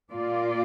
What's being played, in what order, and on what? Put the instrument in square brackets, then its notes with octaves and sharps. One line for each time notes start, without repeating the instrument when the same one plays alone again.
[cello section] A#2 A#3 F4 D5